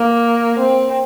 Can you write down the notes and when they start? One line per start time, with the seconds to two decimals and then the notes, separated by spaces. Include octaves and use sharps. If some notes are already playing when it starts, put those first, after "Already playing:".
Already playing: A#3
0.59 C4